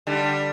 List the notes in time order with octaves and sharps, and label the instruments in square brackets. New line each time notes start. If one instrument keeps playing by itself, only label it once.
[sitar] D3 G3